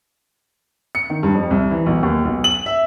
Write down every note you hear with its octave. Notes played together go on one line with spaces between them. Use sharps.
C#7
D#3
G2
F2
C2
E3
B1
D#2
B1
F#7
E5